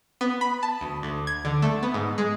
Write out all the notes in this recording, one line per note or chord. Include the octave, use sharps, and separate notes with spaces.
B3
B5
A5
D2
D2
G#6
D3
A3
B3
G#2
G#3